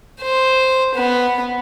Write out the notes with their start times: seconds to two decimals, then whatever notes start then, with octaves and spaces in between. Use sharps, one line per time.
0.21 C5
0.95 B3